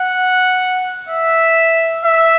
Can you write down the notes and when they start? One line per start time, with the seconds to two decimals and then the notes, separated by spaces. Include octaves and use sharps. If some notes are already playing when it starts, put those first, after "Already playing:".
Already playing: F#5
1.09 E5
2.04 E5